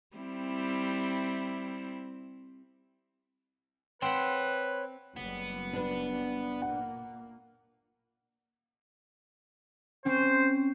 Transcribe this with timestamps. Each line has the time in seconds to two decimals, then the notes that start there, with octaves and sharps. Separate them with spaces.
0.17 G3 C4 E4
4.02 C4 B4 C#5 F#5 B5 C6
5.16 F#1 G3 B3
5.73 D4 B4
6.62 A#2 A#3 F#5
10.05 C4 C#4 C5